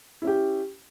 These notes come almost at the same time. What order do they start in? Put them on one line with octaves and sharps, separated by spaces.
E4 C#4 G4